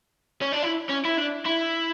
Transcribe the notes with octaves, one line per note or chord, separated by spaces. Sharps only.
C#4
D4
E4
C#4
E4
D4
E4